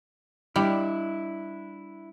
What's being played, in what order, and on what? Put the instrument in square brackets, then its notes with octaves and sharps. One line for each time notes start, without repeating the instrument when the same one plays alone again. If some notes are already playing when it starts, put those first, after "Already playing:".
[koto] G3 [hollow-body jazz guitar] D4 E4